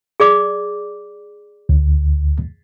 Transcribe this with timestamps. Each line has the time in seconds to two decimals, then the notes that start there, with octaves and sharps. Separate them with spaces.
0.20 G#4 D5 D6
1.69 D2